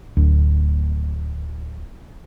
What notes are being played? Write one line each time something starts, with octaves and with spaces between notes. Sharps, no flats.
D1 D2